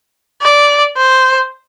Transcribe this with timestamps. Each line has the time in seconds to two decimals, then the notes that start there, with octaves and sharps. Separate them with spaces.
0.42 D5
0.97 C5